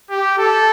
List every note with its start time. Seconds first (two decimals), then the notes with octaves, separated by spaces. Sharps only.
0.10 G4
0.38 A4